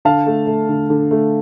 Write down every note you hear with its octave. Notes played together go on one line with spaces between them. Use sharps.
D3 F5 A5
A3
A3
D3
D3
A3